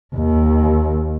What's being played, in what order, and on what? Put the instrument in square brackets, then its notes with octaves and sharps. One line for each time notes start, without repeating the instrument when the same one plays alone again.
[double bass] D#2